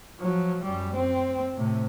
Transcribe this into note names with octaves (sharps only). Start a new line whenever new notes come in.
F3 F#3
F#2 G3
C4
A2 C3